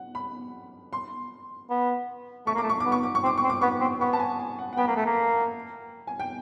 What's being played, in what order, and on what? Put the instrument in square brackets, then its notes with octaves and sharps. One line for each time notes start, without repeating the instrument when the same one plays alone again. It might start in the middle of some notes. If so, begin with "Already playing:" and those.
Already playing: [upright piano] F#5
B5
C6
[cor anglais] B3
[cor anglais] A3 [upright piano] C#6
[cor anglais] A#3 [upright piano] D6
[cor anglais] A3
[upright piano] C#6
D6
[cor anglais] B3
[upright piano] C#6
D6
C#6
[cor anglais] C4 [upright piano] D6
[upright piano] C#6
[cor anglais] C4
[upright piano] D6
[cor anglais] B3 [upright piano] C#6
[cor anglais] C4
[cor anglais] B3 [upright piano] C#6
[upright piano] A5
G#5
G#5
F#5
F#5
[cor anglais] B3 [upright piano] G5
[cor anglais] A#3
A3
A#3
[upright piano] G#5
G5